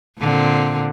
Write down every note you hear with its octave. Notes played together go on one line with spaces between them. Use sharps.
A#2 D3 C4